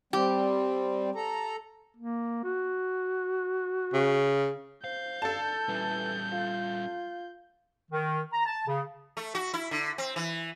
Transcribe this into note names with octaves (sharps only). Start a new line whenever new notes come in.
G3 C4 G4
A4 A#5
A#3
F#4
C#3
C4 F5 G6
D3 A4 A5
E3 G3 C#4
F4
D#3
A#5
A5
C#3
A3
F#4
E4
D3
C4
E3